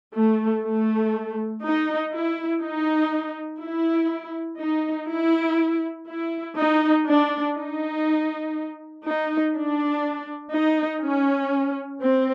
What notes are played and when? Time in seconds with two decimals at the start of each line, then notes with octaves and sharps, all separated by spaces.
0.14 A3
0.63 A3
1.62 D#4
2.12 E4
2.61 D#4
3.60 E4
4.59 D#4
5.08 E4
6.08 E4
6.57 D#4
7.07 D4
7.56 D#4
9.04 D#4
9.54 D4
10.53 D#4
11.03 C#4
12.01 C4